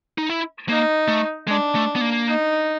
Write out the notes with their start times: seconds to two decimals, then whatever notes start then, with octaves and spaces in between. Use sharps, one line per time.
0.18 D#4
0.29 E4
0.69 A#3 D#4
1.08 A3
1.48 G#3 D4
1.75 A3
1.96 B3
2.01 A#3
2.28 D#4